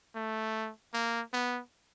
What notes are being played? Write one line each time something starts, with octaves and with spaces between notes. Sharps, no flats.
A3
A#3
B3